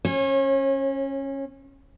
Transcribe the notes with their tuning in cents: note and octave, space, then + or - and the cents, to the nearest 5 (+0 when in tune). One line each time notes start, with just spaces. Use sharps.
C#4 -20 C#5 -40